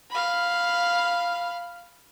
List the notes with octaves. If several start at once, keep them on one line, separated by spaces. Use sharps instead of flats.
F5 B5